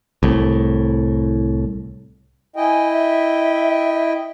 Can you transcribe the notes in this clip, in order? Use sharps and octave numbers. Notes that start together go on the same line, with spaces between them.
C2 A2
E4 D#5 G5 G#5
E5